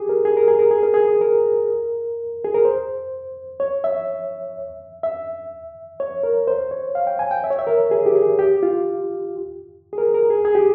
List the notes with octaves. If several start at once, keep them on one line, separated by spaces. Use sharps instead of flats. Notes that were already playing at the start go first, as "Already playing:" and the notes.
Already playing: G4 G#4
A#4
G#4
A#4
G#4
A#4
G#4
A#4
G#4
A#4
G#4
A#4
C5
C#5
E5
E5
C#5
A#4
C5
C#5
F5
G5
G#5
G5
E5
C#5
E5
A#4
G#4
G4
G#4
G4
F4
G#4
A#4
A#4
G#4
G#4
G4